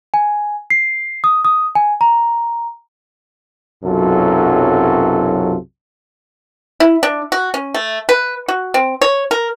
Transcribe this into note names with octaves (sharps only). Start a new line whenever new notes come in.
G#5
C7
D#6
D#6
G#5
A#5
B1 F#2 C3 F#3 F4 A4
E4
D4
F#4
C#4
A3
B4
F#4
C4
C#5
A#4